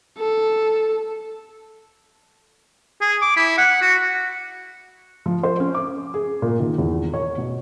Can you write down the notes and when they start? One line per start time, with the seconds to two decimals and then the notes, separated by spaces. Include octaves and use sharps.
0.18 A4
3.01 G#4
3.22 D6
3.36 E4
3.58 F#5
3.81 F#4
5.26 F3
5.43 C5
5.60 C#4
5.74 D6
6.14 G#4
6.42 A#2
6.60 D#3
6.78 E2
7.14 C#5
7.38 B2